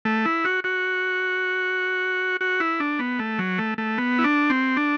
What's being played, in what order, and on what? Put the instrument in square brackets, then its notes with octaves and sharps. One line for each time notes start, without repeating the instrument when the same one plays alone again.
[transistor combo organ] A3
E4
F#4
F#4
F#4
E4
D4
B3
A3
F#3
A3
A3
B3
E4
D4
C4
D4